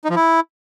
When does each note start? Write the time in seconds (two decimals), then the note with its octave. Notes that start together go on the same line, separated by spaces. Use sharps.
0.05 D#4
0.10 F3
0.16 E4